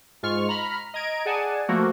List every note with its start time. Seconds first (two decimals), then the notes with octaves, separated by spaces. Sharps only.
0.23 G#2 G#3 F4 C#6 F6
0.49 A#5 B5 F6
0.94 D#5 A#5 G#6 D7
1.25 G#4 D5 F#5 G#5 A5
1.68 F3 A3 A#3 F#4